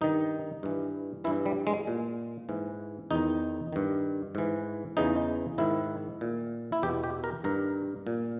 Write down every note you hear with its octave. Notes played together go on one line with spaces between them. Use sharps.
G2 D#3 D#4
G2 E3
G2 E3 E4
G3
G#3
A#2
G#2 E3
E2 D#3 D#4
G2 D#3
G#2 E3
E2 C#3 E3 D#4
G#2 D#3 E4
A#2
E4
E2 B2 G4
G4
A#4
G2 D#3 A#4
A#2